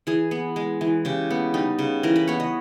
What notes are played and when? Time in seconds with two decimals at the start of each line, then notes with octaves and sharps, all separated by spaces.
0.07 E3 G#4
0.31 B3
0.56 G#3
0.81 E3
1.05 C#3 G4
1.30 B3
1.54 G3 D#4
1.79 C#3
2.03 E3 A#4
2.16 B4
2.27 B3 C#5
2.40 D#5